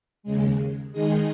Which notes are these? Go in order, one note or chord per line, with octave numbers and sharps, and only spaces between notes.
D#2 C#3 G#3
D#3 G#3 D#4 G#4 D#5